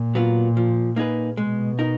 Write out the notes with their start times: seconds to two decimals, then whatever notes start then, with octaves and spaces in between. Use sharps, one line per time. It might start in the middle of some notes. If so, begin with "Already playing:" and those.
Already playing: A#2
0.15 F#3 B3 F4
0.57 F3
0.96 A#3 D#4 G#4 B4
1.37 B2 G#3
1.79 D#4 A#4